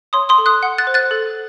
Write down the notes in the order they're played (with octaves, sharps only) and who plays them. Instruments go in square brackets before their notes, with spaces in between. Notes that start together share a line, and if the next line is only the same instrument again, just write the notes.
[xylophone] C#5 C6 D#6
C6 D#6
A4
D#6 F#6
F#5
F#6 A6
C5
F#6 A6
A4